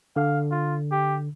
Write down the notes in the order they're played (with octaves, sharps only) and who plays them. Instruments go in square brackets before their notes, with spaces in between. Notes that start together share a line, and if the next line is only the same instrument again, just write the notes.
[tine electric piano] D3 [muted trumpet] F5
[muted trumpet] F4
G4